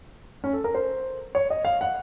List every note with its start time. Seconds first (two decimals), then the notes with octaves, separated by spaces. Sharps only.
0.44 C#4
0.53 A4
0.64 A#4
0.74 C5
1.35 C#5
1.50 D#5
1.65 F5
1.81 F#5